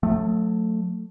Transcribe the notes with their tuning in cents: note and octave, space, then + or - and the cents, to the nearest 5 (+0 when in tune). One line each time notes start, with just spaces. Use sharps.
F#3 -40 A3 +0